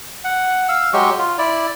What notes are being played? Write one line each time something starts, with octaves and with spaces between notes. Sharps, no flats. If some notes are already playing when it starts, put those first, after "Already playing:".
F#5
F5 E6
F#3 G#3 G4 C#6
F4
E4 D5